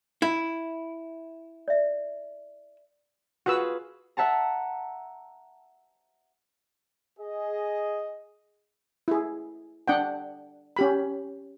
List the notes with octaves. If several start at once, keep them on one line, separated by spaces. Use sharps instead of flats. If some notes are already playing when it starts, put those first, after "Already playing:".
E4
D5 E5
F4 F#4 G#4 B4 E6
E5 F#5 A5 A#5
G#4 D#5
E4 G#4
D4 F#5 G5
C#4 G4 B5